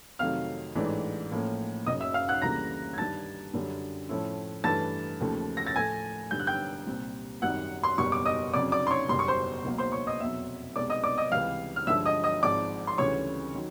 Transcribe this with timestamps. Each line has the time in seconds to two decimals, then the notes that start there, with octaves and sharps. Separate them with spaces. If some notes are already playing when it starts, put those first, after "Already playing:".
0.19 F2 C3 D#3 F#3 A3 F5 F6
0.75 A1 G#2 E3 A3 D4
1.32 A2 F3 A#3 C#4
1.86 F#1 F#2 C#3 D#5 D#6
2.00 E5 E6
2.14 F5 F6
2.28 F#5 F#6
2.42 D2 C#3 E3 G3 A#3 A#5 A#6
2.93 G#6
2.97 G2 D#3 G3 A5 A6
3.54 F#2 D3 G3
4.09 A2 F3 A3 C#4 E4
4.64 G2 E3 A3 A5 A6
5.20 D#2 C#3 F3 A3
5.57 A#6
5.67 A6
5.75 A2 F3 A3 G#5 G#6
6.31 G2 D3 G3 G6
6.40 F#6
6.47 G5 G6
6.87 C2 A#2 G3 C4
7.42 G#1 F#2 D#3 G3 F#5 F#6
7.83 C6
7.98 F#1 E2 B2 G3 C#6
8.12 D6
8.26 D#5 D#6
8.54 F2 C#3 F#3 D5 D6
8.72 D5 D6
8.87 C6
8.90 C#5 C#6
9.09 F#1 E2 B2 G3 C6
9.19 C#6
9.28 C5 C6
9.64 C#2 B2 F#3 A#3
9.78 C5 C6
9.92 C#5 C#6
10.07 D#5 D#6
10.20 F1 E2 B2 F#3 E5 E6
10.75 C2 B2 G#3 D5 D6
10.90 D#5 D#6
11.04 D5 D6
11.18 D#5 D#6
11.32 C#2 C3 E3 G3 F5 F6
11.76 F6
11.87 G2 D3 F3 G#3 E5 E6
12.06 D#5 D#6
12.24 D#5 D#6
12.43 G#1 G#2 F3 D5 D6
12.87 C6
12.98 D2 C#3 E3 G3 C#5 C#6
13.54 D#3 F#3